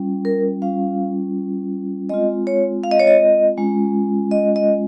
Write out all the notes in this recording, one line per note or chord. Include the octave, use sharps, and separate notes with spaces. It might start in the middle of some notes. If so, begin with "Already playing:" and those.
Already playing: G3 C#4 F4
A#4
G3 C#4 F4 F5
G#3 C4 F4 D#5
C#5
F5
D#5
C#5
D#5
G#3 C#4 F4
D#5
D#5